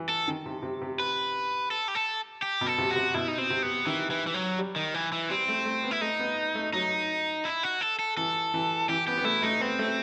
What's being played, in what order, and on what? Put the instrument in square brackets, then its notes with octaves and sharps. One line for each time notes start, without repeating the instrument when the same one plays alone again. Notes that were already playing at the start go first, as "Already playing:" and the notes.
Already playing: [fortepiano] E3
[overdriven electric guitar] A4
[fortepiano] D#3
C3
C3
C3
[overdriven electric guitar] B4
A4
G4
A4
G4
[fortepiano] B2
[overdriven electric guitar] A4
[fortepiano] C3
[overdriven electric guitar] F#4
[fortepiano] C3
[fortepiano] B2 [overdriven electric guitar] E4
[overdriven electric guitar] D#4
C4
[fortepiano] C3
[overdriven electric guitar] B3
[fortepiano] D#3 [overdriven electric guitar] E3
[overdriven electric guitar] E3
E3
F#3
[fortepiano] G3
[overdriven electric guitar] D#3
E3
E3
[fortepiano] G3 [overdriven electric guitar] C4
[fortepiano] A3
A3
B3
[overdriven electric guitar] E4
[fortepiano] A3 [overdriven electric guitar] D#4
[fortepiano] B3
A3
[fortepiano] F#3 [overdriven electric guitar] D#4
[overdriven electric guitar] E4
F#4
A4
A4
[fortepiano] E3 [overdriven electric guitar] A4
[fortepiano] E3
[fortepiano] E3 [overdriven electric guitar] G4
[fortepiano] B3 [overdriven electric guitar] G4
[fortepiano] B3
[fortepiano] A3 [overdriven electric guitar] E4
[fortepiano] A3 [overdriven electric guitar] D#4
[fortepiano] B3 [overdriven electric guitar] C4
[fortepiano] A3